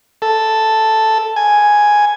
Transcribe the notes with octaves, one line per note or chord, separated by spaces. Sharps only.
A4
G#5